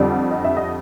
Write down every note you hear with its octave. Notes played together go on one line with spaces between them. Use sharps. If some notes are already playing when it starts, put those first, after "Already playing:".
Already playing: F2 D3 G3 D5
D#5
E5
D#5